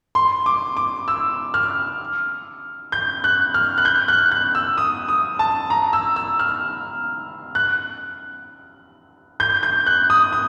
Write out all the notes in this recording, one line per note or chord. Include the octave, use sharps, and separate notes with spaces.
C6
D6
D6
E6
F6
G6
F#6
F6
F#6
G6
F#6
F#6
E6
D#6
D#6
A5
A#5
E6
E6
F6
F#6
G6
G6
F#6
D#6
D#6